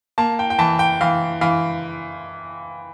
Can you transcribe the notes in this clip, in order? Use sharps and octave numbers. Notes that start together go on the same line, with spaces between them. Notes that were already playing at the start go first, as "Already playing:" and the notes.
A#3 A5
G5
G5
E3 A5
G5
E3 F5
E3 F5